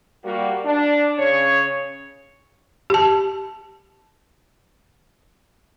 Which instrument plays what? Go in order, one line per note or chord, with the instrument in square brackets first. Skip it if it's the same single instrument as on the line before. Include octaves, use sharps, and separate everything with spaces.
[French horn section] G3 A#3 F#4
D4
C#3 C#4 C#5
[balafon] G4 A5